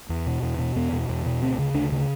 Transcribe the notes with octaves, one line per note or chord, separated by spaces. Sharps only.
E2
B2
E2
B2
E2 B3
B2
E2
B2
D2 C4
C#3
D2 D4
C#3